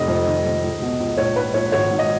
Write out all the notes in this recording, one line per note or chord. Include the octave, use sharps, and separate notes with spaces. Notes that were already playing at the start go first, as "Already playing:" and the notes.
Already playing: F1 D#5
F2
D#3
F2
C#2
B2
C#2
A#1 C#5
G#2 B4
A#1 C#5
G#1 C#5
G#2
D#5